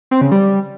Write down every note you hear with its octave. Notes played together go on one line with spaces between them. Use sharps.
C4
C#3
G3